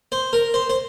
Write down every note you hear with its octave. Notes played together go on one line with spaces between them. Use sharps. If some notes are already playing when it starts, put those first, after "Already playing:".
C5
A#4
C5
C5